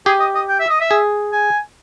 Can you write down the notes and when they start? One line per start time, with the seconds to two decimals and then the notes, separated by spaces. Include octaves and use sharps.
0.06 G4 G#4
0.20 D#5
0.35 D#5
0.48 G5
0.60 E5
0.70 D#5
0.80 E5
0.91 G#4
1.32 G#5